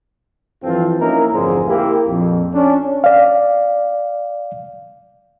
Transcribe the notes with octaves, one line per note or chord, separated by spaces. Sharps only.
G2 E3 F3 C4 F4 A4
A#3 C#4 D#4 E4 A#4
A1 F2 G#2 D3 G#4 C5
A#3 E4 G4
A#1 F2
C#4 D4
D5 F5